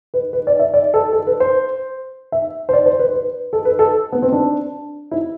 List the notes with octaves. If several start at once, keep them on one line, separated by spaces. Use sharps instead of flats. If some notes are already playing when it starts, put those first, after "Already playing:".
B4
B4
D5
E5
D5
A4
A4
B4
C5
E5
C5
D5
C5
B4
B4
A4
B4
A4
B3
C4
D4
E4